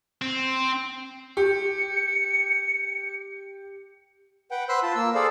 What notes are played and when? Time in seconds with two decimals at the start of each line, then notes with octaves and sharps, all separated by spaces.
0.22 C4
1.37 G4 C#7
4.51 B4 F#5 G5
4.69 B4 C5 B5 C6 E6 F#6
4.83 F4 A5
4.96 A#3 E6
5.15 G#4 A4 C5 D5 F5